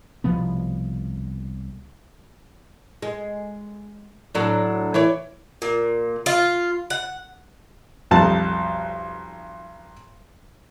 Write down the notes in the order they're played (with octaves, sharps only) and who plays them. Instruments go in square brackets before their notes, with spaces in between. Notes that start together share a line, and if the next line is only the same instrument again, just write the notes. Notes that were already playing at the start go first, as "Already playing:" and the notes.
[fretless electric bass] C2 B2 F3 B3
[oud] G#3
A2 F#3 D4
E3 C#5 D5
[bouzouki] A#2
F4
F#5
[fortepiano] B1 F2 G3 A5